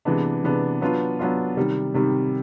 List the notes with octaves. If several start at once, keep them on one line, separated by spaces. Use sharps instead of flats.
C3 E3 G#3 B3 D4
C3 E3 G#3 B3 D4
F#3 B3 D4 F4
F#3 B3 D4 F4
C3 D#3 G3
C3 D#3 G3